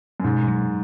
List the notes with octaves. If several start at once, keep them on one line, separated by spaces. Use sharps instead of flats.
F#2
G#2 B2
F#3